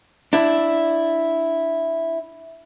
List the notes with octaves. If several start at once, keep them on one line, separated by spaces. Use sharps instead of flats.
D4 E4